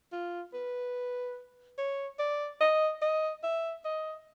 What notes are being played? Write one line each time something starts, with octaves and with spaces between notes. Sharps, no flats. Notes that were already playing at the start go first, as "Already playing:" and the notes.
F4
B4
C#5
D5
D#5
D#5
E5
D#5